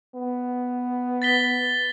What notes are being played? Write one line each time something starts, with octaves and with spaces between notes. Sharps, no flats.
B3
A6 B6 G7